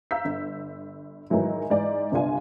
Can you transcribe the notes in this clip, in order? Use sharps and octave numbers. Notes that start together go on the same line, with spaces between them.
F5 A#5 E6 G6 B6
G1
G#2 D#3 E3 F#3 E4
G#2 E3 D5
G1 C2 B3 D4 F4 G#5